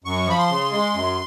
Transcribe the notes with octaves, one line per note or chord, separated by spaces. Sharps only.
F#2 C#6
F3 B5
C6
C#3
G#3
F#2